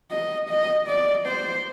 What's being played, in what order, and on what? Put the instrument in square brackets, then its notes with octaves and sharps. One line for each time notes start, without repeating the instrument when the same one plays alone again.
[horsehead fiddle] D#5
D#5
D5
C5